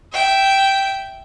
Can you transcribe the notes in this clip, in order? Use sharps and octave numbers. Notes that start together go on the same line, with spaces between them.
E5 G5